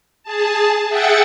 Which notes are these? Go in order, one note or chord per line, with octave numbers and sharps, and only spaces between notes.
G#4 A5
G#4 E5 F#5 G5 A6 C#7